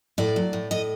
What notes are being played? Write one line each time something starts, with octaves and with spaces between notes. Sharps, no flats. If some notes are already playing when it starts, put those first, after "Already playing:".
A2 D5
F#3
A2
A2 D#5